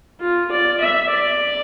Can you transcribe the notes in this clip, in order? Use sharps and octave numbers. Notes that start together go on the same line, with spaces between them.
F4
D5
E5
D5